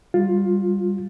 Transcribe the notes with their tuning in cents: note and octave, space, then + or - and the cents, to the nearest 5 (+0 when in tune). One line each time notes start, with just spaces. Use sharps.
G3 +0 F4 +15